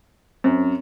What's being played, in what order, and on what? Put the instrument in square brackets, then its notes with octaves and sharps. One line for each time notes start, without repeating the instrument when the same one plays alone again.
[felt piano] F#2 [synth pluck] C4